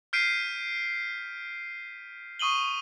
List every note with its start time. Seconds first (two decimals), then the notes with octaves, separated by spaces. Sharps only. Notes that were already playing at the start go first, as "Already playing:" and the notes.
0.13 F6 G6 B6 C7 D7 D#7
2.39 C#6 D#6 D#7 F#7 G7